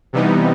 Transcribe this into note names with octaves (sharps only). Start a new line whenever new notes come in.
C3 E3 G3 B3 D#4